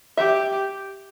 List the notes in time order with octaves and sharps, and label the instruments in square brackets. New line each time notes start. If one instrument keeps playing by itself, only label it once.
[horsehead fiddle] G4 [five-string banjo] E5